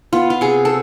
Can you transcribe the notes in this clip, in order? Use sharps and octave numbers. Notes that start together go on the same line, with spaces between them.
B3 F4
F4
C3 G#4
A4